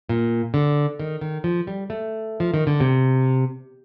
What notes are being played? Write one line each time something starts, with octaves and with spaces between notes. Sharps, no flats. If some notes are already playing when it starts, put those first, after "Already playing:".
A#2
D3
D#3
D#3
F3
G3
A3
F3
D#3
D3
C3